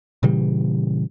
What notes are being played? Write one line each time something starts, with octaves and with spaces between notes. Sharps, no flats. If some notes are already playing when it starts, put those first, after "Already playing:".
A#2 C#3 E3 G3